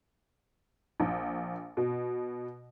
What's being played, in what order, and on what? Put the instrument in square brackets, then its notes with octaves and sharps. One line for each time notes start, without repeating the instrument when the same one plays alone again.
[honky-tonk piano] A#1
B2